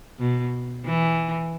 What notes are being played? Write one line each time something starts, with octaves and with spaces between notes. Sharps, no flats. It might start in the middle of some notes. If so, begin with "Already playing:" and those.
B2
E3